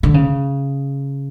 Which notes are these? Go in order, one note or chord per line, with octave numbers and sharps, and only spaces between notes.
D3
C#3